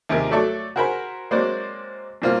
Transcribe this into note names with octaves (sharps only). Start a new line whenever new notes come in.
D#2 C3 G#4 A#4
F#3 A3 A4 D5 C#6
F#4 G#4 A#4 C5 B5
F#3 G#3 A#3 C4 C5 D5
G2 A#2 A#3 C4 F4